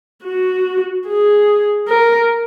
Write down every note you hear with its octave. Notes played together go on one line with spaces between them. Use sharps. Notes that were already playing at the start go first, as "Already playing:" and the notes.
F#4
G#4
A#4